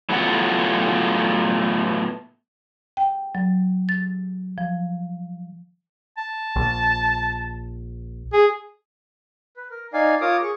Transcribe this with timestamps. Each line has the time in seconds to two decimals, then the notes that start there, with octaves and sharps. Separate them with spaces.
0.09 A2 F#3 A3 B3 F4 F#5
2.97 G5
3.35 F#3
3.89 A6
4.58 F3
6.18 A5
6.56 A#1
8.33 G#4
9.57 B4
9.71 A#4
9.93 D#4 D5 F5 G#5
10.21 F4 A#4 C#5 D6 D#6
10.43 G#4 C#6